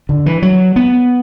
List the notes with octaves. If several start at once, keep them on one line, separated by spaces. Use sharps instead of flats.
D3
E3
F#3
B3